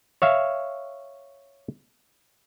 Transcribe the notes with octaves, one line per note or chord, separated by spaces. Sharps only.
C#5 E5 F5